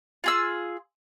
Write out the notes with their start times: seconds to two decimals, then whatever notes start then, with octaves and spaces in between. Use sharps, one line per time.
0.24 F4 G#4 E6